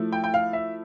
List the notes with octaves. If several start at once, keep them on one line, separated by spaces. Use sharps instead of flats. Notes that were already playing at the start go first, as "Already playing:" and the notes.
Already playing: F3 A3 E4
G5
G5
F5
E5